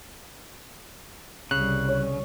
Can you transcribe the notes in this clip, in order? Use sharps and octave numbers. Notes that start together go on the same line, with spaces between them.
C2 C#3 G3 F#6
C#5